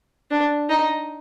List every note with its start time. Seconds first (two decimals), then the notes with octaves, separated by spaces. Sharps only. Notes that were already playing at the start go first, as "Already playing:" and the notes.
0.31 D4
0.69 D#4